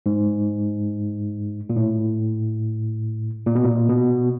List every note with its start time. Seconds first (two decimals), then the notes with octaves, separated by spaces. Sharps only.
0.06 G#2
1.70 A#2
1.76 A2
3.46 A#2
3.55 B2
3.64 A#2
3.89 B2